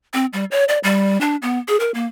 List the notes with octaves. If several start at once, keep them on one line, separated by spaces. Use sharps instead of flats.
C4
G3
C#5
D5
G3
D4
B3
G#4
A#4
A#3